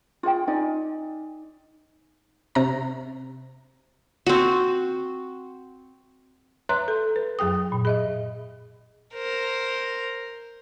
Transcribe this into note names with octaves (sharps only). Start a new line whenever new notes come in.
F4 G#4 F#5 G5
D#4 D5 G#5
C3 A#5
C4 F#4
B4 C#5 E5 A#5 C6 F#6
A4
B4
F#2 F#3 G#4 G5 D#6
A#2
G#4 D#5 E5
A#4 C5